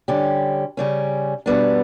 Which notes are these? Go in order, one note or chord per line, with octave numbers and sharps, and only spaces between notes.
D3 G3 C#4 G4
C#3 G3 C#4
B2 G3 B3 D4